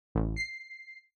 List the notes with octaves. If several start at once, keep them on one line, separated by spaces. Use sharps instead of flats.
A1
C7